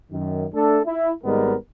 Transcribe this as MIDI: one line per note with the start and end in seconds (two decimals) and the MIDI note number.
0.12 0.45 42
0.12 0.45 51
0.54 0.80 57
0.54 0.80 62
0.54 0.80 69
0.86 1.11 64
1.24 1.54 32
1.24 1.54 44
1.24 1.54 55
1.24 1.54 56
1.24 1.54 59
1.24 1.54 70